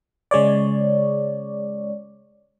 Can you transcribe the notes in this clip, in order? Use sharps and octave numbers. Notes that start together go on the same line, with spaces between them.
C#3 G#3 C#5 D5